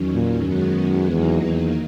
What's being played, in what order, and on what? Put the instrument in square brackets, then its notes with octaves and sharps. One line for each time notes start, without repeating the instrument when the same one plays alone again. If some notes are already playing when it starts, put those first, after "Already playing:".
Already playing: [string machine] E2 D#3 F#3 C#4
[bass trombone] A#2
[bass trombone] F#2 [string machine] D#3 G#3 B3 F#4
[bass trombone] E2 [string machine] D#3 F#3 A#3 D#4
[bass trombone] E2